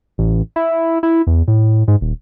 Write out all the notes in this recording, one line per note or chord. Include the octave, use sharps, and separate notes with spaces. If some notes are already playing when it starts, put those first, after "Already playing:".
A1
E4
E4
E2
A2
G#2
D#1